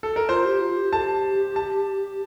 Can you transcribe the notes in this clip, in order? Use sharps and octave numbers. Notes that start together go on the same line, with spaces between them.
A4
A#4
F4 C5
G4
F4
G4
A4 A5
G4
A5